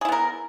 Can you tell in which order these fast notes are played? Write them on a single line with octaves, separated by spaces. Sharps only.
G#4 E4 B3 A#4